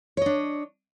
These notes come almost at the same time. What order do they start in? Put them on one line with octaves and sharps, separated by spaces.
C#5 D#5 D4